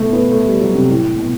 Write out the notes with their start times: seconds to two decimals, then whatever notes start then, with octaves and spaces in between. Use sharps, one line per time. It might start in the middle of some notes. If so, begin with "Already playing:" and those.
Already playing: B2 A3
0.13 B3
0.32 A3
0.46 G3
0.61 F#3
0.75 C3
0.89 A2
1.18 B2